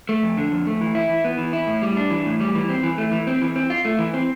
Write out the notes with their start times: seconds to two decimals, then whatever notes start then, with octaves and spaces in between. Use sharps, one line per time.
0.09 A3
0.23 F2
0.37 D3
0.52 F2
0.67 A3
0.81 E3
0.95 E4
1.10 E3
1.24 B3
1.38 E3
1.53 E4
1.67 A2
1.82 G3
1.97 D4
2.10 E3
2.26 A2
2.41 G3
2.55 E3
2.69 C4
2.83 E3
2.98 A3
3.12 E3
3.27 C4
3.42 E3
3.56 C4
3.70 F4
3.85 A3
3.99 E3
4.14 C4